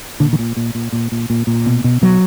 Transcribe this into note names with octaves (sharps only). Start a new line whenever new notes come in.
A#2 D3
D#3
A#2
A#2
A#2
A#2
A#2
A#2
A#2
B2
B2
B2 F#3